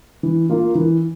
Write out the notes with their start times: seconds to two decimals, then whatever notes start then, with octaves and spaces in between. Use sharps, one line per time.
0.23 E3
0.50 A#3 F4
0.75 E3